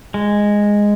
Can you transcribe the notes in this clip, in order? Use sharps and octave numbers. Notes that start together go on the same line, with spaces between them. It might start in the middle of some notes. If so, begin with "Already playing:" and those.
G#3